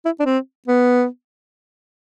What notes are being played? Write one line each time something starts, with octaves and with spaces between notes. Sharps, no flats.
E4
D4
C4
B3